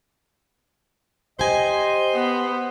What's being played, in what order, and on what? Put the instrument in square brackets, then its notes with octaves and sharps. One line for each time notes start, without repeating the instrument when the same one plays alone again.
[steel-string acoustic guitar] G4 G#5 [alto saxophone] C5 [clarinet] D#5
[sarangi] B3